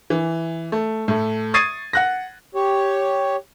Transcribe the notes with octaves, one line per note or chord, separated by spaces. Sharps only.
E3
A3
A2 A3
C#6 D#6 G#6 A6 C7 D#7
F#5 F#6 A#6
G4 C#5